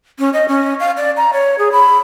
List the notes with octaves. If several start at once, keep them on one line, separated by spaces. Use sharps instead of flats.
C#4
D#5
C#4
F5
D5
A#5
C#5
G#4
B5